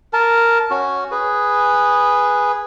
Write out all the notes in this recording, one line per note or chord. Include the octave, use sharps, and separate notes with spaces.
A#4 A5
C#4 F#4
G#4 B4